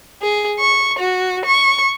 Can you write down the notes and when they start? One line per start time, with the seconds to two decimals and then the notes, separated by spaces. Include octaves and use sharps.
0.22 G#4
0.59 C#6
0.99 F#4
1.45 C#6